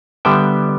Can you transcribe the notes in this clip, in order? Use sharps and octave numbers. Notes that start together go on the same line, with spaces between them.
D3 G3 B3 E5 G5